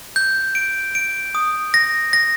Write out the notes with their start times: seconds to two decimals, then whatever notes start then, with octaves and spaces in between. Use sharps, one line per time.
0.16 G6
0.55 D7
0.95 D7
1.35 D#6
1.74 A#6
2.13 A#6